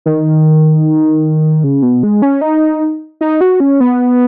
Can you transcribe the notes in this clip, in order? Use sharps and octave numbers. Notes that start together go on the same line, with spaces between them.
D#3
C#3
B2
G#3
C#4
D#4
D#4
F#4
C#4
B3